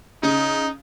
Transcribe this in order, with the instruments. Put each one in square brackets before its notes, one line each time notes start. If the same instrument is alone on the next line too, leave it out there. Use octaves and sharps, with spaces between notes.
[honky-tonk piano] C#3 [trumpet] D#4